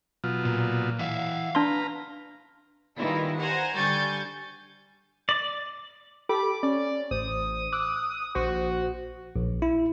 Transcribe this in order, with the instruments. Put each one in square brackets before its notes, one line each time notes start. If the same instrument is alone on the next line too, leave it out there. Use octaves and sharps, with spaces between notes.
[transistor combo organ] B2 F#3 F4
[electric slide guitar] A#2
[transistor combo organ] E3 [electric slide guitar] E5 F5
[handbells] D4 C6 [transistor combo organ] B4 F5 A#5
[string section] D#3 E3 G3 E4 F4
C5 F#5 G#5 A#5
D3 G3 G#5 C#6 G6 A6
[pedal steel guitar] D5
[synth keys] G4 A4 B5 [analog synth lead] D6
[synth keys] C#4 [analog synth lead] D5
[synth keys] A1 C5 [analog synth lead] D#6
[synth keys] D6 E6 F#6
[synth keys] A#1 C5 [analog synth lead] F#4
[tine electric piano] A#1
E4